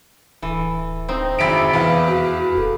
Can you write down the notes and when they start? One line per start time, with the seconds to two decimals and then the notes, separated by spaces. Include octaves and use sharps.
0.42 D1 E3 A4
1.09 C4 D#4
1.39 G#1 F2 G#3 E4 E5 B6 D7
1.73 E2 B4 F5
2.07 F#4
2.56 D#1 A4